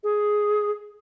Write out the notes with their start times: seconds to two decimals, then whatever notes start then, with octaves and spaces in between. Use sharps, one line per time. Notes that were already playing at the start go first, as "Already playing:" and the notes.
0.03 G#4